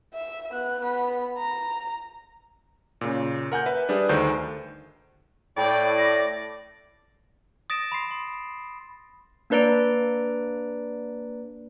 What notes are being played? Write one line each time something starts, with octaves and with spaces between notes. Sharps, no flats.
E5
B3 F#6
B3 B5
A#5
A#2 C#3
A#4 F#5 G#5 G6
B4 E5
G3 D4 G#4 B4
D2 D#3 A4 C5 G6
A2 D5 G5
A#6
D#6 A6 A#6 D7 E7
B5 C6 C7
C6
A#3 D4 B4 D5 A#5 D7